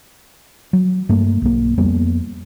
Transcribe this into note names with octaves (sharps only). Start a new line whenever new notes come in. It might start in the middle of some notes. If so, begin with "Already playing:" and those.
F#3
G2 A3 A#3
B1 A#3
F2 G3 A#3 B3